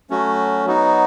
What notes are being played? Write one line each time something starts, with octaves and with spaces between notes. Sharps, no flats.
F#3 A3 C#4 F#4
F#3 B3 D#4 F#4